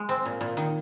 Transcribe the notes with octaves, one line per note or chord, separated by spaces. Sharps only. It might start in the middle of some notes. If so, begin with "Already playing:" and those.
Already playing: G#3
C4
A#2
A#2
D#3